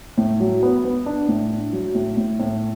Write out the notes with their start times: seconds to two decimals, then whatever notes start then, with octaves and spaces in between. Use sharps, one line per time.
0.17 A2
0.40 F#3
0.63 B3
0.85 B3
1.06 D4
1.28 A2
1.50 D4
1.72 F#3
1.94 A2
2.17 A2
2.40 A2